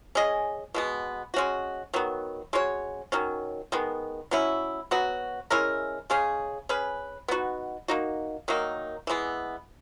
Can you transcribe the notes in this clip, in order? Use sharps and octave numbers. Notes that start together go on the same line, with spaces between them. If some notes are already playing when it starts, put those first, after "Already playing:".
C#4 G#4 D#5
B2 G#3 B3
G#3 C#4 F#4
D#3 F#3 B3
G#3 C#4 F#4 C#5
D#3 F#3 C#4
D#3 G#3 B3
F#3 C#4 E4
F#3 B3 F#4
G#3 C#4 E4 A#4
C#3 G#3 C#4 G#4
C#4 G#4 B4
B3 D#4 F#4
A#3 D#4 F#4
D#3 F#3 A#3 D#4
E3 G#3 B3